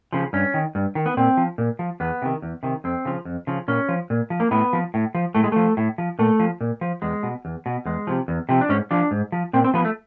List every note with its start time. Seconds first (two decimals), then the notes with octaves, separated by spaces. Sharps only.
0.12 C#3 F3
0.33 G2 C#4
0.54 D#3
0.75 G2
0.95 D#3
1.06 B3
1.17 A#2 C4
1.37 F3
1.58 A#2
1.79 F3
2.00 E2 B3
2.22 C3 D#3
2.42 E2
2.63 C3 D#3
2.84 F2 C4
3.05 C#3 F3
3.25 F2
3.47 C#3 F3
3.68 A#2 C#4
3.89 F3
4.10 A#2
4.30 F3
4.40 A#3
4.51 A2 B3
4.73 F3
4.94 A2
5.15 F3
5.35 A2 A3
5.44 G#3
5.52 F3 A3
5.77 A2
5.98 F3
6.19 A#2 A3
6.40 F3
6.61 A#2
6.81 F3
7.02 E2 G#3
7.23 B2
7.45 E2
7.66 B2
7.85 E2 G#3
8.07 C3 F3
8.28 E2
8.49 C3 F3
8.61 D4
8.69 G#2 C#4
8.91 F3 D4
9.11 G#2
9.32 F3
9.53 A#2 C4
9.64 C4
9.74 F3 B3
9.85 A3